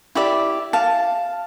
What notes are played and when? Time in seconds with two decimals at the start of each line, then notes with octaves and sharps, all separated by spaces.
0.15 E4 G4 D5 E5
0.73 F5 A5